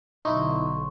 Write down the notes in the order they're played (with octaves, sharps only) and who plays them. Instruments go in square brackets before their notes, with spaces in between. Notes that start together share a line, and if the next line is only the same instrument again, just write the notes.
[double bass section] B1 D3 [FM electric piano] D#4 E4 [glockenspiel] C6 C#6